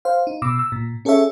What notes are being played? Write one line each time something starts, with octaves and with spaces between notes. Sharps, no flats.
C5 F5
D#4
B2 D6 E6
E6
A#2
C#4 G#4 A4 C#5 E5